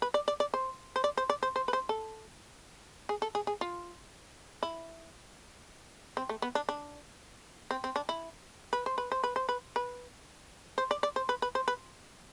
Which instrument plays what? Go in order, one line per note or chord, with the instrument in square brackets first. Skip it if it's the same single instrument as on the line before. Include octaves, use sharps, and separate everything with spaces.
[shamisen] B4
D5
D5
D5
C5
C5
D5
C5
D5
C5
C5
B4
C5
A4
G#4
A4
G#4
G#4
F4
E4
C4
A3
B3
D4
D4
C4
C4
D4
E4
B4
C5
B4
C5
B4
C5
B4
B4
C5
D5
D5
C5
B4
B4
C5
B4